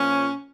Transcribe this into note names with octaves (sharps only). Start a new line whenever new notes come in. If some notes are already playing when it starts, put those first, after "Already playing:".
Already playing: A#2 F3 C#4